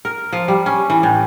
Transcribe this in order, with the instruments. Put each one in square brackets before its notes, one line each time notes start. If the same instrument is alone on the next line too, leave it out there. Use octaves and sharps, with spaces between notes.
[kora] A#4
F3
G3
C#4
E3
A2